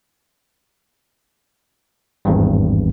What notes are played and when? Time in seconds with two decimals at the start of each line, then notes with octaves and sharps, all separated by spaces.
2.25 G#1 E2 G2